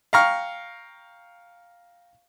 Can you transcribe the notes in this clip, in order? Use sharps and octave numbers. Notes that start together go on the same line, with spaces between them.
F5 G5 A#5 C#6 F6